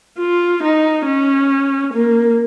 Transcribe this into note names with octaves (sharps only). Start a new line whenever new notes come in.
F4
D#4
C#4
A#3